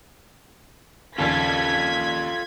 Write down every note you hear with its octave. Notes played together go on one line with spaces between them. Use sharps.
A#1 D#2 C#3 F4 A4 G#6 B6